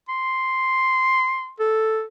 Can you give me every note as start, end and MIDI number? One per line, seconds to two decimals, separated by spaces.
0.09 1.53 84
1.60 2.03 69